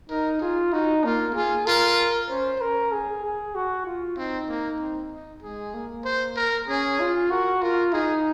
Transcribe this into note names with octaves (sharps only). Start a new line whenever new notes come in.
D#4 A#4
F4 G#4
D#4 F#4
A#3 F4
F4 G#4
F4 A#4
C#4 C5
C#4 A#4
G#4
G#4
F#4
F4
C4 D#4
A#3
C4
D#4
G#3 G#4
A#3
C5
A#4
C#4 G#4
F4
F#4 A#4
F4 A#4
D#4 G#4